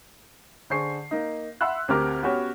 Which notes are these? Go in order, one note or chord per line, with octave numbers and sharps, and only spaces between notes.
D3 G#4 C5 C#6 C7
A#3 D#4
E5 F#5 B5 C6 E6 F#6
D2 C4 G4 A#4 D6 F6
B3 C#4 F#4 G4 C#5